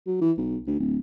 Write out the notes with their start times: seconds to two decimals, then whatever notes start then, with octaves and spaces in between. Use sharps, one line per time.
0.07 F#3
0.21 E3
0.37 B1
0.67 D2
0.79 D1